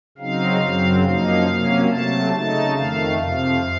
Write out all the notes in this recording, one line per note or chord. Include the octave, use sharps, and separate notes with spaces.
C#3 F#3 C4 D#4 F5
F#2 C#3 F#3 C4
F#2 F3 A#3 D#4 F5
C3 F#3 A#3 C#4
C3 F#3 A3 A5
C#3 A3 D#4 A5
F2 D#3 A3 F5
F2 C3 F3 F5